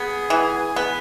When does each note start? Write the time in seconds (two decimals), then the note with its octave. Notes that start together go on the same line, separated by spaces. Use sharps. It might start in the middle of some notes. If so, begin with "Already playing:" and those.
Already playing: B3 G#4
0.30 E3
0.76 B3